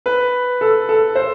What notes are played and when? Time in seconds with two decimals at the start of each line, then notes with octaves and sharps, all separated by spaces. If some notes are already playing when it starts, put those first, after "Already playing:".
0.06 B4
0.61 A4
0.89 A4
1.15 C5